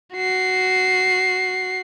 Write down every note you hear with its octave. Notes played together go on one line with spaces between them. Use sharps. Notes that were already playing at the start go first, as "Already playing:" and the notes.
F#4 C7